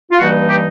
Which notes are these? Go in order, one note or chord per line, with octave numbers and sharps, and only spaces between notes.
F4
G2 E3 G3 A#3 D#4 F#4
G4